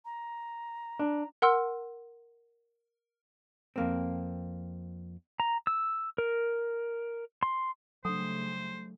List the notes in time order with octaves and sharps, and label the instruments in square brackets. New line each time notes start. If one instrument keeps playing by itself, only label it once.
[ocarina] A#5
[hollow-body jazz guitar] D4
[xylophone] A#4 F#5 C6 E6
[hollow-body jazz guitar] F2 A#3 C4
[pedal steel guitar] A#5
E6
A#4
C6
[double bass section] C#3 G3 A3 [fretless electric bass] F#3 D4 [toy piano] A4 F#5 [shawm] C5